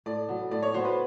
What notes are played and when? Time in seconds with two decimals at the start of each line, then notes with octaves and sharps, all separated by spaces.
0.06 A2 D5
0.29 F#3 B3
0.51 A2 D5
0.63 C#5
0.74 F#3 B3 C5
0.85 B4